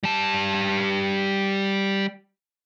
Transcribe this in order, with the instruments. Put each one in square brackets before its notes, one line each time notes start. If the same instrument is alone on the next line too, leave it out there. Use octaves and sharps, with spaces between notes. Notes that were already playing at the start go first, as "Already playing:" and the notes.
[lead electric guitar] G3 A5